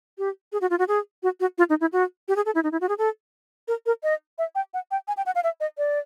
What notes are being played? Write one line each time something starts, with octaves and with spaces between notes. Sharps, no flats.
G4
G#4
F#4
F4
F#4
G#4
F#4
F#4
F4
D#4
E4
F#4
G4
G#4
A4
E4
D#4
E4
F#4
G#4
A4
A#4
A#4
D#5
E5
G5
F#5
G5
G#5
G5
F#5
F5
E5
D#5
D5